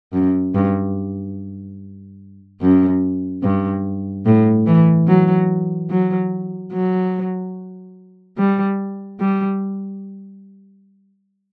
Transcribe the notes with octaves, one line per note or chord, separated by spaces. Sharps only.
F#2
G2
F#2
G2
A2
E3
F#3
F#3
F#3
G3
G3